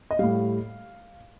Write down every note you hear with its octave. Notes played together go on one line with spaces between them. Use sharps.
D#5
A2 G3 F5